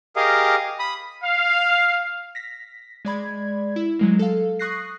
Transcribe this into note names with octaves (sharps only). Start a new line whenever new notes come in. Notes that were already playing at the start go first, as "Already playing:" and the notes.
G4 G#4 A#4 D#5 F5
B5 D#6
F5
A#6 B6
G#3 D5 B5 G#6
E4
F#3 G#3 A#3
A4 F5
C#6 D#6 F#6 A#6 C7